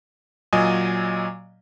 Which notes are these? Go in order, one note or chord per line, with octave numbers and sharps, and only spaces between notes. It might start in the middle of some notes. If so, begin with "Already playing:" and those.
A#2 F#3 D#5 G#5 D#6